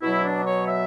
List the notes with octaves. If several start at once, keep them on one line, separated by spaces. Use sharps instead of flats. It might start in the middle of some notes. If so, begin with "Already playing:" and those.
B2 F#3 E4
D4
C#5
E5